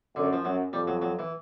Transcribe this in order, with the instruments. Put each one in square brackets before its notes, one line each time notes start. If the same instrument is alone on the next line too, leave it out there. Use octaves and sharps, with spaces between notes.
[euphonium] F#2 [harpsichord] D3
[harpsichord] F3
[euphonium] F#2 [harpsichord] F#3
[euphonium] F2 [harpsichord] G3
[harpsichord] F#3
F#3
E3